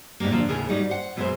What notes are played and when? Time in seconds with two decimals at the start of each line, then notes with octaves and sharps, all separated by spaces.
0.20 G#2 B2 F3 G3 A#3
0.32 A#2 D3 F3 A#3 C4
0.48 D#2 A2 C#3 G#4 A#4
0.69 G#2 G3 D#4 F#4
0.89 C5 F#5
1.16 F#2 B2 E3 G#3 E4 C5